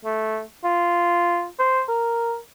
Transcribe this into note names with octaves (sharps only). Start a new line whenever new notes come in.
A3
F4
C5
A#4